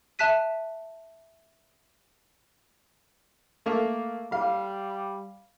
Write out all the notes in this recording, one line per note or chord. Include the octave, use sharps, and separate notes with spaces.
E5 A5 F#6 B6 D#7
A3 A#3
G3 F5